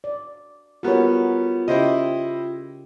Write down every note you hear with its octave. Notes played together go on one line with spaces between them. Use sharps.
D5
G3 B3 F4 F#4 A#4 C#5
C#3 E4 G4 C5 D#5